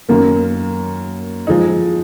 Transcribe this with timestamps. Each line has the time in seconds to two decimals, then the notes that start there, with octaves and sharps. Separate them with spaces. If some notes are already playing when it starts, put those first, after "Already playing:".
0.09 F#2 D#3 A#3
1.47 F3 G#3 D#4